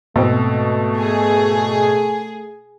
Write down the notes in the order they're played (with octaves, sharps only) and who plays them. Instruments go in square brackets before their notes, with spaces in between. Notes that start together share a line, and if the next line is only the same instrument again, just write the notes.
[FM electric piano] G#2 [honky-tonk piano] B2 C4 [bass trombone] A3
[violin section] G#4